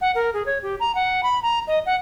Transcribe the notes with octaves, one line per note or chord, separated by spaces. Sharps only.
F#5
A#4
G#4
C#5
G4
A#5
F#5
B5
A#5
D#5
F#5